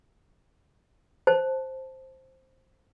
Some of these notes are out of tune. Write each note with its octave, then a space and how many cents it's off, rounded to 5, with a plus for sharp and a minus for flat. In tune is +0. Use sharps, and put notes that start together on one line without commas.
C5 +5 A5 +0